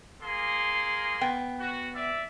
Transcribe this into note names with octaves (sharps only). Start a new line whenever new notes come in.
A#3 G#4 C6
B3 G5
F#4
D5 E5